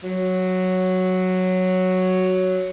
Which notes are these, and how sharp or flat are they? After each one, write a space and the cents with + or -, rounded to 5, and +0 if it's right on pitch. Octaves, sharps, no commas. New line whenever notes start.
F#3 +0